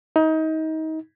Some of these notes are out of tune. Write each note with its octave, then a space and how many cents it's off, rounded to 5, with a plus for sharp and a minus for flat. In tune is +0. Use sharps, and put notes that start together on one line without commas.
D#4 +30